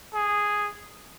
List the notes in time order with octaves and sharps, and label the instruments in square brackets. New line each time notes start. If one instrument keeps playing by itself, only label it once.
[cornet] G#4